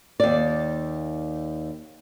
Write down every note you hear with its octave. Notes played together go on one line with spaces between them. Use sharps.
D#2 D5